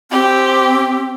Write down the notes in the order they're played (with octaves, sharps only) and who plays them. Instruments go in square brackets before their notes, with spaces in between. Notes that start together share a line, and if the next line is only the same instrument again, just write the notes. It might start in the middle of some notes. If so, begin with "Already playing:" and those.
[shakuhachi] C4 [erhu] G4